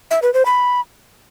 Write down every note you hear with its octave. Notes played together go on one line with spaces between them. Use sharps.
E5
B4
C5
B5